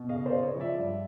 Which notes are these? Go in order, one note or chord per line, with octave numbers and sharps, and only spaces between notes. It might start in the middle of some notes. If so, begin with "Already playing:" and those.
Already playing: B2
C#3 D#5 F5
C5 D5
C#3
C#5 D#5
F3
D5 E5
G2